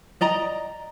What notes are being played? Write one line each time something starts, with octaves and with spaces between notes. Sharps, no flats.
D5 D#5 A#5